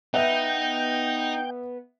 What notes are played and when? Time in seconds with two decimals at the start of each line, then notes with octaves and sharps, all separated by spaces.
0.14 B3 D#4 E5 F#5 G5